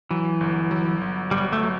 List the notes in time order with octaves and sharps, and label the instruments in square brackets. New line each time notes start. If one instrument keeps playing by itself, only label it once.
[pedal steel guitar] E3 [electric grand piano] F#3
[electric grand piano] G1
F#3
G1
[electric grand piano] G1 [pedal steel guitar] G3
[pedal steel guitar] A3
[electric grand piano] F#3